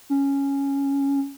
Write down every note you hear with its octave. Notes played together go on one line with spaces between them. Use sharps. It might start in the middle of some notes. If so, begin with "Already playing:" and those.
C#4